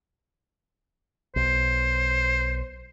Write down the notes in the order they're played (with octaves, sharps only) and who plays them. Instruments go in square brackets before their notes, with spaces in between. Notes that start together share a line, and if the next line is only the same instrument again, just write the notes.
[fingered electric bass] B1 [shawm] C5